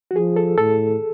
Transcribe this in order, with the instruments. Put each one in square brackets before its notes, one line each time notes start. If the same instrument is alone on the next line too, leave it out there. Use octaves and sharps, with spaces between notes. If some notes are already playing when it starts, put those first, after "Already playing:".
[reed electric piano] F#4
[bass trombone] F3 [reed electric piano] G#4
[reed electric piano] A4
[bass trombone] A2 [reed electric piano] A4